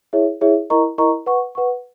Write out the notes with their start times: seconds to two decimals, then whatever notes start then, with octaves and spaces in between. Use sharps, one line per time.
0.13 E4 G#4 C#5 E5
0.41 E4 G#4 C#5 E5
0.70 E4 A#4 D#5 A#5 C#6
0.98 E4 A#4 D#5 A#5 C#6
1.26 B4 F#5 C#6
1.55 B4 F#5 C#6